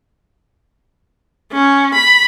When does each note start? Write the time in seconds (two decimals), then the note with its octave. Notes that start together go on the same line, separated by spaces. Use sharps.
1.53 C#4
1.94 B5